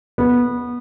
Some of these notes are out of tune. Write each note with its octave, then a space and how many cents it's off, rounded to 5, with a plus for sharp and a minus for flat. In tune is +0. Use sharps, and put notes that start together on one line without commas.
B3 -15